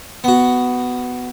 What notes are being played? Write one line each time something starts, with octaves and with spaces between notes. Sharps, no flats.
B3 F#4